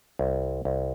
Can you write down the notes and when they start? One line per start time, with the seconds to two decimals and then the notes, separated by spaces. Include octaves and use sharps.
0.19 C2
0.65 C2